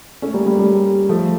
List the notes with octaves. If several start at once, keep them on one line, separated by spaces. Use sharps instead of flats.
A3 C#4
G3 A#3
G3
G3
F3 A3